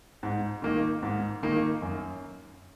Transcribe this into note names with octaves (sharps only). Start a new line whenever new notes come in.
G#2
D#3 A#3 D#4
G#2
D#3 A#3 D#4
F#2